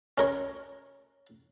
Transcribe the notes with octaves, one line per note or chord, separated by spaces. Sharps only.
C#4 A#4 C#5